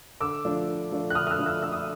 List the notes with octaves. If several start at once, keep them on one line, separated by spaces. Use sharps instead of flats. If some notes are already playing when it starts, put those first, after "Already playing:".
D3 D6 E6
F3 A3 D4
D3
F3 A3 D4
F#6
D3 D#6 F6
F6
E6 F#6
F3 A3 D4
E6 F#6
D3 E6
D#6